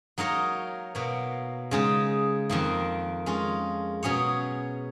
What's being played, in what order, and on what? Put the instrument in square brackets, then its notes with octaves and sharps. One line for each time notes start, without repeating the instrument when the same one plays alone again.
[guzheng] F#3 A#3 D#4 A#4 C#5
B2 F#3 A#3
C#3 G#3 D#4
F2 D#3 A#3
G#3 C#4 F4
B2 F#3 C#4 G#4 C#5